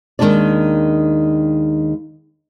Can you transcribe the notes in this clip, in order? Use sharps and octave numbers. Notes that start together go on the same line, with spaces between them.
D#2 D#3 G3 G#3 D4 D5